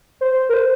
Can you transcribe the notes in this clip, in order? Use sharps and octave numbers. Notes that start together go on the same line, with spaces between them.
C5
A#4
C5